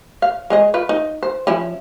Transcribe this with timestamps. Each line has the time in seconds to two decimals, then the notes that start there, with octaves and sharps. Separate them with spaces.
0.22 F5
0.50 G#3 G#4 D#5
0.74 F4 B4
0.89 D#4
1.23 C5
1.47 F3 C#4 E4